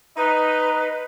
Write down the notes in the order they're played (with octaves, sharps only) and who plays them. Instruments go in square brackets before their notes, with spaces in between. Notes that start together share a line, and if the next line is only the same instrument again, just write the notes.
[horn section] D#4 [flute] B4